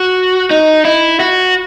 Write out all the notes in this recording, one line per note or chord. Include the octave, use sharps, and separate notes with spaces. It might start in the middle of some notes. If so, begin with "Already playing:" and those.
Already playing: F#4
D#4
E4
F#4